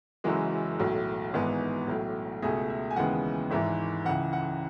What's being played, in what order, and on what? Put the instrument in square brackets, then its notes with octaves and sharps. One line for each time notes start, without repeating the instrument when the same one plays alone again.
[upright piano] F#1 F#2 E3 G#3 F#4
B1 A2 F#3
G#1 G#2 E3 G#3 B3
B1 A2 F#3
C#2 B2 A3 G#4
E5
G#5
D#2 C#3 E3 G#3 B3 F#5
G#1 G#2 E3 E5
C#2 C#3 E3 F#5
F#5